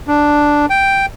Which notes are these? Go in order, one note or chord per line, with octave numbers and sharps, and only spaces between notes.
D4
G5